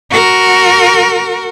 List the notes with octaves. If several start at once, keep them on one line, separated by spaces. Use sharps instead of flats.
F#4 A#4